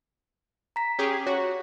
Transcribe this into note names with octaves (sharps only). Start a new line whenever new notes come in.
A#5 B6
C#4 G4 G#4
F#4 C#5